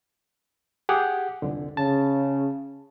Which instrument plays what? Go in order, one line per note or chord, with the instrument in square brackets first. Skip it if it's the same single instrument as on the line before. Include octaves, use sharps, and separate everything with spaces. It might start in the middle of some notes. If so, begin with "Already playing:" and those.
[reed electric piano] G4 G#4 F#5
C2 F2 D3
[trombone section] C#3 [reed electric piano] A5